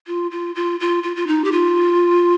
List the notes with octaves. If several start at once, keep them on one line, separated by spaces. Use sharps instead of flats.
F4
F4
F4
F4
F4
F4
D#4
G4
F4